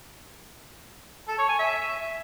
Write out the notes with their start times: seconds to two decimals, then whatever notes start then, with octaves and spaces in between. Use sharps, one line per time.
1.28 A4
1.38 C#5
1.49 G#5
1.59 E5